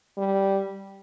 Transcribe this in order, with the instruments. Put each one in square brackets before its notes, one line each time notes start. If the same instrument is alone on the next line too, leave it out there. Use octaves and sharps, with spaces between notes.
[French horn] G3